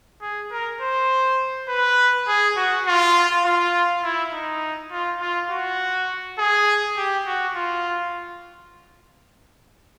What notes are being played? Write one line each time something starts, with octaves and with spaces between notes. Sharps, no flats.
G#4
A#4
C5
B4
G#4
F#4
F4
F4
E4
D#4
F4
F4
F#4
G#4
G4
F#4
F4